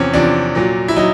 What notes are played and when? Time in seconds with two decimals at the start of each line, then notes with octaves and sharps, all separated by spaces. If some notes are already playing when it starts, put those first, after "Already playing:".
Already playing: E2 C3 F3 C4 C#4
0.13 E2 C3 F3 D4
0.55 A#2 F#3
0.88 E4
0.96 F#3 D#4